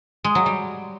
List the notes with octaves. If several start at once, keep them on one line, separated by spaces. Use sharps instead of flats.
G#3
F#3
G3